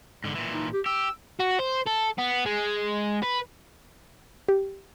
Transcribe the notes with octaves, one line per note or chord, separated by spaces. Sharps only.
G#2 D3
A#2 E3
D#4
G4
G4 E6
F#4
C5
A4
B3
G#3
B4
G4